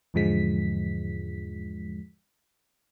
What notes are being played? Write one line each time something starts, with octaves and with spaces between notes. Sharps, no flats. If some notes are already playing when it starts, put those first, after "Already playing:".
E2 G#2 D3 F3 G#3 B6